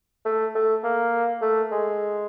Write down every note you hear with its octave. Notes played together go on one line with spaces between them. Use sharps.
A3
A3
A#3
A3
G#3